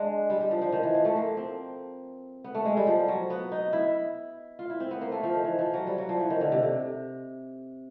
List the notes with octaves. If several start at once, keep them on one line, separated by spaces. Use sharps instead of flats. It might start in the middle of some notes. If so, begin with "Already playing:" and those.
Already playing: G#3 D4
G3
G3
F3
F3
D#3
E3
F3
A3
A#3
C4
B3
A3
G#3
G3
F3
F#3
B3
D#4
E4
F4
E4
C4
B3
A#3
A3
F3
D#3
E3
F3
F#3
G3
F#3
F3
E3
D#3
D3
C3
C3